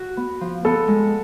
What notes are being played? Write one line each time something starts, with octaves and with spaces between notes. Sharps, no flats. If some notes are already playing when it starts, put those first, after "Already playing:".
Already playing: F#4
B3
F3
B3 A4
G#3